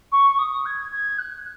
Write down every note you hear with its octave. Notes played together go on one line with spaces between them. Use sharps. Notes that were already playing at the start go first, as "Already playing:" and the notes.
C#6
D#6
G#6
G#6
F#6